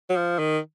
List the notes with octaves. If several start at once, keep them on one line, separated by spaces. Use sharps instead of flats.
F#3
F3
D#3